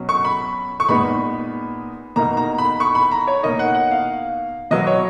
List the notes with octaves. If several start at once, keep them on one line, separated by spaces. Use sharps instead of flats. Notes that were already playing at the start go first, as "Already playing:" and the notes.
Already playing: B2 F#3 C#4
C#6
B5
C#6
A#2 G#3 B3 D#4 B5
B2 A#3 D#4 A#5
A#5
B5
C#6
B5
A#5
C#5
B2 A#3 D#4 D#5
F#5
F#5
F5
B2 F#3 B3 D#5
C#5